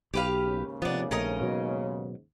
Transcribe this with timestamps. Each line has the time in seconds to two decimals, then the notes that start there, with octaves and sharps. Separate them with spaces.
0.14 B1 G4 B4 F5
0.46 D#2 G#2 C#3
0.82 C3 F3 B3 D4
1.11 A#1 A3 C#4 A#4 D#5
1.41 B2 F#3